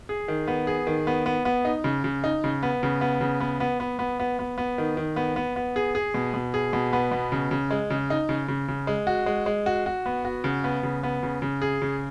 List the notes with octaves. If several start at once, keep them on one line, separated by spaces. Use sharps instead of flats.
G#4
D#3
B3
G#4
D#3
B3
B3
B3
D#4
C#3
C#3
D#4
C#3
B3
C#3
B3
C#3
B3
B3
B3
B3
B3
B3
B3
D#3
D#3
B3
B3
B3
G#4
G#4
B2
B2
G#4
B2
B3
B2
C#3
C#3
G#3
C#3
D#4
C#3
C#3
C#3
G#3
F#4
G#3
G#3
F#4
F#4
B3
F#4
C#3
B3
C#3
B3
C#3
C#3
G#4
C#3